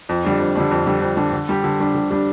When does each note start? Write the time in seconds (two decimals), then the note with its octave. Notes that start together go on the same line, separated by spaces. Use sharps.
0.09 F2
0.25 D3 G3 D4
0.40 F2
0.55 D3 G3 D4
0.71 F2
0.86 D3 G3 D4
1.02 F2
1.17 D3 G3 D4
1.33 D3
1.49 G3 D4 G4
1.64 D3
1.80 G3 D4 G4
1.95 D3
2.10 G3 D4 G4